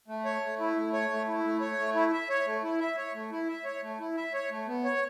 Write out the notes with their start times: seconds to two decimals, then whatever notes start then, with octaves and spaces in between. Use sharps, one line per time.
0.08 A3
0.25 C#5
0.43 A3
0.60 E4
0.76 A3
0.93 C#5
1.10 A3
1.28 E4
1.44 A3
1.61 C#5
1.78 A3
1.95 E4
2.12 E5
2.29 C#5
2.46 A3
2.63 E4
2.80 E5
2.97 C#5
3.14 A3
3.32 E4
3.48 E5
3.65 C#5
3.82 A3
4.00 E4
4.17 E5
4.34 C#5
4.50 A3
4.67 B3
4.84 C#5